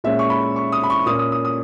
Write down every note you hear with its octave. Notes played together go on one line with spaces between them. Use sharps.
A#2 G#3 C#4 E5
C#6
B5
C#6
D#6
B5
C#6
A#2 A#3 C#4 D#6
D#6
D#6
D#6